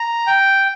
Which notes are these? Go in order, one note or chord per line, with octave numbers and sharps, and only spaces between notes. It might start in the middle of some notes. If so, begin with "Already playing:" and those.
Already playing: A#5
G5